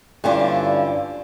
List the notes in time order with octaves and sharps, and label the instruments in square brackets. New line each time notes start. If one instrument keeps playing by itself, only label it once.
[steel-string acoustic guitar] G2 D3 C#4 D4 E4 F4